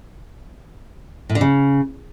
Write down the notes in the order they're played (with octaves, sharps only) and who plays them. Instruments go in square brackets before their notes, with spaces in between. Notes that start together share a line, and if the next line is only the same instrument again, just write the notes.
[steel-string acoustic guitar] A2
D3
C#3